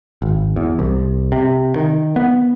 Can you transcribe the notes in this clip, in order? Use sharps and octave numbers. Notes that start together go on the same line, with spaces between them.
G#1
E2
C2
C3
D#3
B3